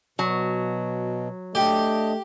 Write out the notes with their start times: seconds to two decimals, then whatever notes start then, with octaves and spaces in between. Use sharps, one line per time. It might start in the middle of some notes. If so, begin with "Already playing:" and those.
0.19 B2 F#3
1.55 A3 D4 G4 D#5